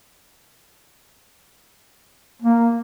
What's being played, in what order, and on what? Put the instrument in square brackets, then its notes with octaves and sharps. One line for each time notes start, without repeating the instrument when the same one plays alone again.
[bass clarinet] A#3